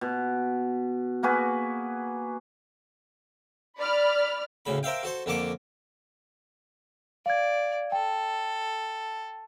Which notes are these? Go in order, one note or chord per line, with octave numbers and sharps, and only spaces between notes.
B2
A#3 F#4 G#4 B4
D5 B5 F6
D2 A2 C#3 B5
A#4 C5 E5 F5 G5
F#4 A4 C5 C6
F2 D3 A#3 A5 C#6 D6
D5 F5 G#6
A4 G5